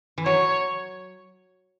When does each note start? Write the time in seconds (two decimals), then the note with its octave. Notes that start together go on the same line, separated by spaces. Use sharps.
0.18 E3
0.25 F#3 C#5